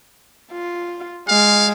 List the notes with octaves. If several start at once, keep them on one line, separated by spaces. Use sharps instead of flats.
F4
G#3 F5